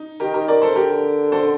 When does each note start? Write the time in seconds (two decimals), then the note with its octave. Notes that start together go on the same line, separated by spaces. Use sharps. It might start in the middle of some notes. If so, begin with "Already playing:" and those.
Already playing: D#4
0.20 D#3 G4 A#4
0.34 G4 A#4
0.48 A#4 D5
0.62 A4 C5
0.76 D3 G4 A#4
1.32 A4 C5